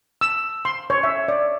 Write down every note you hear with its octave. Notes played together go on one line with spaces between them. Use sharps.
E6
C6
C#5
E5
D5